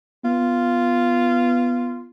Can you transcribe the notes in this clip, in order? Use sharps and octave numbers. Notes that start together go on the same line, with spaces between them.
B3 F4